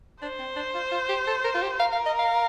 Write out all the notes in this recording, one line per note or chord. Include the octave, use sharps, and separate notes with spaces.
D4 C5
C4
D4
F4
F4
G4
A4
A#4
F4
G4
A#4 F5
F5
D#5
F5